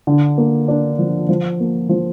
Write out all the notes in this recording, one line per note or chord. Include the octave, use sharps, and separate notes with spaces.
D3
A#3
D4
F3
F3
A#3
F3